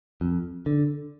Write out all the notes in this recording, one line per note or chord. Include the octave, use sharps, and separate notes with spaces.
F2
D3